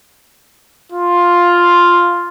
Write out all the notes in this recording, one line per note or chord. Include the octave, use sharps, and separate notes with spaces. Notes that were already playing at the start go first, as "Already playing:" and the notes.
F4